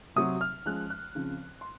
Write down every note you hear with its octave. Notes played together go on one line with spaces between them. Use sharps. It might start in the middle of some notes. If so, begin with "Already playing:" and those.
C3 F#3 C4 D#6
F6
F3 G#3 C#4 F#6
F#6
C#3 F3 C4
C6